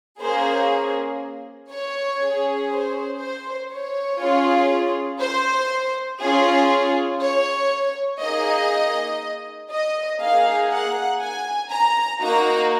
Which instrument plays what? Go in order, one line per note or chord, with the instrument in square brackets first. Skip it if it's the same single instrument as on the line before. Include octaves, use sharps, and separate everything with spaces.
[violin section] A#3 C#4 G#4 C5
C#5
C#4 G#4
C5
C5
C#5
C#4 F4 G#4
C5
C#4 F4 G#4
C#5
A#3 D#4 G#4 D#5
D#5
A#3 D#4 G#4 F5
F#5
G#5
A#5
A#3 D#4 F#4 A#5